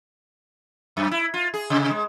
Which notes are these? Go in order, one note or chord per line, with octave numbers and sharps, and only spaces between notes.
F#2
E4
F4
G#4
C3
G#3